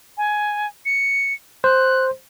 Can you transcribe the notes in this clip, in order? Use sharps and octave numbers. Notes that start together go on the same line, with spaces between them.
G#5
C#7
C5 F#6